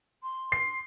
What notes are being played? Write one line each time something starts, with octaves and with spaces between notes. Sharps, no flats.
C6
C7